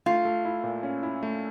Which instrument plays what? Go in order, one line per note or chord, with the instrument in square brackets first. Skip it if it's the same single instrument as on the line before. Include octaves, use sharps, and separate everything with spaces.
[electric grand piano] A3 [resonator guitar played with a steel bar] F4
[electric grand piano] A3
E4
A#2
C#4
E4
A3